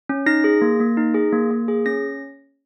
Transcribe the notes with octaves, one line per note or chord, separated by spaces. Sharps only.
C#4
D#4 A#6
G#4
A#3
A#3
D#4
G#4
A#3
A#3
G#4
C#4 A#6